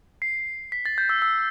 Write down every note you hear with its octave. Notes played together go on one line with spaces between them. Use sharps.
C7
B6
A6
G6
E6
E6